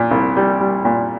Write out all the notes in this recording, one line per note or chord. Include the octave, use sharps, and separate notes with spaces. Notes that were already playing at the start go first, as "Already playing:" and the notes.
Already playing: A#2
C2
G3
G3
A#2